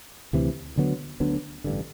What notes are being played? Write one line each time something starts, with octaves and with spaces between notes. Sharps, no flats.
D2 C3 E3
D2 D3 F#3 B3
D2 D3 F#3 B3
A1 G2 D3